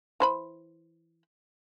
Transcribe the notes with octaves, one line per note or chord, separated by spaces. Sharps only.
E3 C5 B5